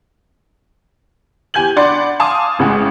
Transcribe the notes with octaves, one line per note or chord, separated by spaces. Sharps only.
E2 G4 G#5 G6 G#6 F#7
D4 D5 F#5 B5 C6
F5 G#5 A5 C6 D6 D#6
A1 C#3 G#3 F#5 G5